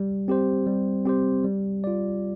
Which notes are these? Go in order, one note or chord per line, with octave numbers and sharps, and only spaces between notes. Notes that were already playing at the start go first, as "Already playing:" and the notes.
Already playing: G3
C4 G4 C5
G3
C4 G4 C5
G3
F4 D5